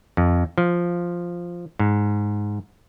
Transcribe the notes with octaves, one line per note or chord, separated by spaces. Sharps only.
F2
F3
G#2